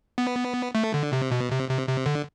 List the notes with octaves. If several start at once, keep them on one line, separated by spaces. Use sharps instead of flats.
B3
A3
D3
C3
B2
C3
C3
C3
D3